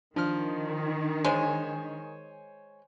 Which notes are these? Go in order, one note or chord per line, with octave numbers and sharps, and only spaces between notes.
D#3 F3 D4 F6
G#3 C5 C#5 G#5